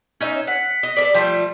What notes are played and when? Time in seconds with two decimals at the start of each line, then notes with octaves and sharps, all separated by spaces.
0.21 C#4 D#4 E5
0.35 C#5
0.47 F#5 B6
0.83 D#5
0.97 A4 A#4 D5
1.14 F3 G3 A3